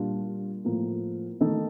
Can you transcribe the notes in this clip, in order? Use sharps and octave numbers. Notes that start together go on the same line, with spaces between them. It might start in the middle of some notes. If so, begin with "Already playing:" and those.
Already playing: A#2 G3 D4 F4
A2 F3 A#3
D#3 A3 D#4 A4